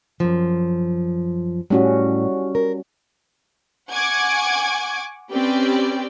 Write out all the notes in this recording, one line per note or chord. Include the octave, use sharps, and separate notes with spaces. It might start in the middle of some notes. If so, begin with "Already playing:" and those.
F#2 F3
A2 G3 C#4 F#4
A#4
F#5 G#5 C#6 D6 G#6
C4 C#4 G4 B4 D5 G5